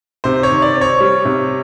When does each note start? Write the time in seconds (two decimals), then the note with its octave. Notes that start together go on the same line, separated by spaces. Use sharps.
0.24 C3 C5
0.43 C#5
0.50 D#3
0.62 D5
0.75 C4
0.81 C#5
1.01 G3
1.25 C3